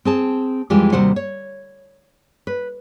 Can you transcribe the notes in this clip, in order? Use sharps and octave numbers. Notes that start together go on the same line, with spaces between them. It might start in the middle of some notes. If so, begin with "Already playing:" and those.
C4 G#4 A5
F2 E3 G3 G#3 F4 G4
D#2 C3 G3 F#4 C5 F#5
C#5
B4